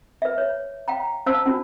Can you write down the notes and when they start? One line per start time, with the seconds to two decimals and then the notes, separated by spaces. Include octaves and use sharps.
0.22 B4 E5
0.38 C#5
0.88 F5 G5 A#5
1.26 C#4 C5 F5 A5 E6
1.46 C#4 D4 F#4